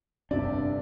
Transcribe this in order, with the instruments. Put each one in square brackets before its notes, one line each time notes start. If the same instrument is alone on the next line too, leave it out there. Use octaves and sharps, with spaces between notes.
[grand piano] G1 C3 D5 [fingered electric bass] D4